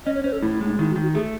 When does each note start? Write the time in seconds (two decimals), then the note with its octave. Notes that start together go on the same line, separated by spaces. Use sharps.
0.06 C#4 D#5
0.15 C#5
0.24 C#4 C5
0.32 A4
0.42 A2 E4
0.54 E4
0.61 G#3
0.66 D#4
0.79 D#3 E4
0.91 F#4
0.96 D#3
1.03 F#4
1.14 A3 G#4